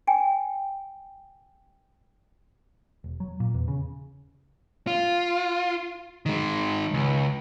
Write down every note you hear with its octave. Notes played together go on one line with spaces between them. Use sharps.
G5 G#5
E1
F#3
A#2
E2
C#3
F4
D#3 G#3
C#2